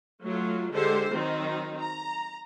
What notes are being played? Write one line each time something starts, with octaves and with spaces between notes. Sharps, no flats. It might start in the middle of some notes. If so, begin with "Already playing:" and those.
F#3 A3 F4
D3 G#3 G4 A4 C5
D#3 F#3 C4 D#4
A#5